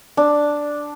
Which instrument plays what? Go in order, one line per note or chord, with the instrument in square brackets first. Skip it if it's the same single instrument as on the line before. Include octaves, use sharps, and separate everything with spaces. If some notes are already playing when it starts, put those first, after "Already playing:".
[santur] D4